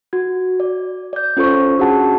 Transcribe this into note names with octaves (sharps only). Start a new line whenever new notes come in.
F#4 G#6
D5
D5 G6
C#4 F4 A4 C5 C#6
C#4 D4 F#4 G#4 F#5 A5